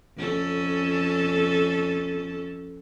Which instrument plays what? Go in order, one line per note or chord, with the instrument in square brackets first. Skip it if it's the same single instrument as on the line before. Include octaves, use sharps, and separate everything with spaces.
[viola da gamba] F2 C#4 A4